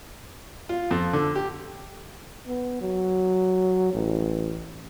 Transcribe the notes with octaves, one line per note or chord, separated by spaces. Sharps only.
F4
F2
D3
G4
B3
F#3
A1